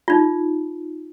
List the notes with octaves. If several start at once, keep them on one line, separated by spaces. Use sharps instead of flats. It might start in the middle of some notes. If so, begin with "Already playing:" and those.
D#4 F4